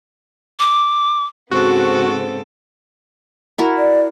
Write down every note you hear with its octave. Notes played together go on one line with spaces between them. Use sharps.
D6
G#2 C#3 B3 C4 F#4 A4
E4 F#4 A#4
D5